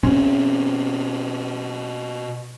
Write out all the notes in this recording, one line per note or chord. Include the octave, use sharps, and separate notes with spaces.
B2 C4 C#4